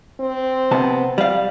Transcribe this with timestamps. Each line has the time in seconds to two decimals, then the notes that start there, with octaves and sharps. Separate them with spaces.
0.20 C4
0.71 C3 B3 A5
1.18 G3 F5